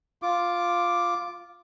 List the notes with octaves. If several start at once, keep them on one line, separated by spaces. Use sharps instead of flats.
F4 D6